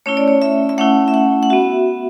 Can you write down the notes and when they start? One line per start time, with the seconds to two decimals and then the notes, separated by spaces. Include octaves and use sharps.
0.06 A3 C#4 E4 C#5
0.17 D5
0.28 C#5
0.42 E5
0.69 E5
0.78 A3 C#4 E4 F#5
1.08 E5
1.14 F#5
1.43 F#5
1.50 B3 F#4 E5